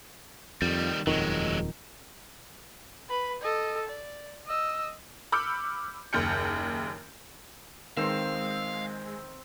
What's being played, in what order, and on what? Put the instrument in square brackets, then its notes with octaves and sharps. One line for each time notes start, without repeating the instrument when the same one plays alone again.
[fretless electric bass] F2 [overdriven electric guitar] D#3 G3
[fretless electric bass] D#1 F2 D#3 [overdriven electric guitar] F#3 G#3
[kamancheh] B4 B5
A4 D#5
D5
D#5 E6
[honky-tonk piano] B5 D6 E6 F6 G6 C#7
F#1 D#2 F6 G6 C#7
[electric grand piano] D#3 E7 [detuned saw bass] G#3 [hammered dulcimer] C4 C5 [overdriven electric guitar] F5